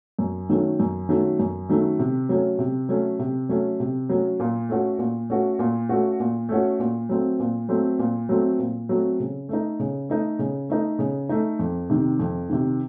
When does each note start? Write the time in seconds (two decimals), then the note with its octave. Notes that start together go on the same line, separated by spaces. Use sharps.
0.19 F#2
0.49 D#3 F#3 A3 C#4
0.79 F#2
1.09 D#3 F#3 A3 C#4
1.39 F#2
1.69 D#3 F#3 A3 C#4
1.99 C3
2.29 F#3 A3 C#4
2.59 C3
2.89 F#3 A3 C#4
3.19 C3
3.49 F#3 A3 C#4
3.80 C3
4.09 F#3 A3 C#4
4.40 A#2
4.69 A3 C#4 F#4
4.99 A#2
5.30 A3 C#4 F#4
5.59 A#2
5.89 A3 C#4 F#4
6.20 A#2
6.49 A3 C#4 F#4
6.80 A#2
7.09 F#3 A3 C4
7.40 A#2
7.69 F#3 A3 C4
7.99 A#2
8.29 F#3 A3 C4
8.59 A#2
8.89 F#3 A3 C4
9.20 C#3
9.49 A3 D#4
9.80 C#3
10.09 A3 D#4
10.39 C#3
10.69 A3 D#4
10.99 C#3
11.29 A3 D#4
11.59 F2
11.90 C3 D#3
12.19 F2
12.49 C3 D#3